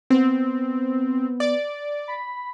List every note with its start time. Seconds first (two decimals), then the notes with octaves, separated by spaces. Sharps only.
0.10 B3 C4
1.40 D5
2.08 B5